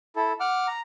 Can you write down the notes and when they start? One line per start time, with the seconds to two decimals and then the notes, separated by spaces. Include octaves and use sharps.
0.16 E4 A4
0.40 F#5 D6 F6
0.67 A#5